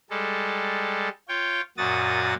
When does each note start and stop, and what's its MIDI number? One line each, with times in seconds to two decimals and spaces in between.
0.10 1.09 55
0.10 1.09 56
0.10 1.09 69
1.28 1.61 65
1.28 1.61 73
1.28 1.61 79
1.77 2.34 42
1.77 2.34 46
1.77 2.34 66
1.77 2.34 87
1.77 2.34 93